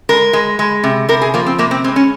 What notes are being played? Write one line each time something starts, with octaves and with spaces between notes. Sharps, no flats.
G#3 A#4
G#3
G#3
C3
C3 A#4
G#4
F3 A#3
C4
C3 A#3
C4
G#3 C4
C#4